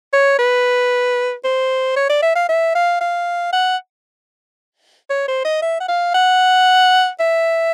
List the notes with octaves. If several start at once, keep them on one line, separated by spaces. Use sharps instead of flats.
C#5
B4
C5
C#5
D5
E5
F5
E5
F5
F5
F#5
C#5
C5
D#5
E5
F#5
F5
F#5
E5